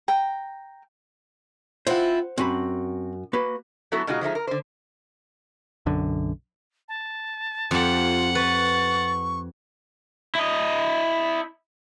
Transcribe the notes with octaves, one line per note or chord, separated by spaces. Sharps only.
G5 A#5
C4 E4 F4 C5 F#5
F#2 C4 F#4 B5
A#3 F#4 B4
F#3 A3 B3 E4 F#4 A4
B2 G#3 D#4 F4 F#4
F3 G#3 A3 D#4
A#4
D3 C5
B1 F#2 D3
A5
F2 F4 G4 F#5
B4 C#6 A6
E4 D#5